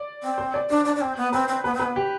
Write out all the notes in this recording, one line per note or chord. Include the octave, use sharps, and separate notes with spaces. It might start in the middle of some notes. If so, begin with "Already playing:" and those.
Already playing: D5
C4
C5
D5
D4 C5
D4
D4
C4
B3
C4 B4
C4
B3 B4
C4
B4
B3
G4